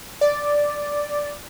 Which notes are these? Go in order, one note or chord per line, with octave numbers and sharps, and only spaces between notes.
D5